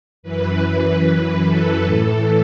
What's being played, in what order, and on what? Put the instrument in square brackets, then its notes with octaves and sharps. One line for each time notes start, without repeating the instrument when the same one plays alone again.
[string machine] F#2 E3 B4
A4
A2 E3